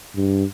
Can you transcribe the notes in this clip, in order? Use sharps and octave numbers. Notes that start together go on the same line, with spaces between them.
G2